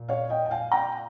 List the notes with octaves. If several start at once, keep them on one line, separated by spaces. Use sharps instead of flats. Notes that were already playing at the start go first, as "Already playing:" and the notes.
Already playing: A#2
C#5 F5
D#5 G5
G5
F5 G#5
G5 A#5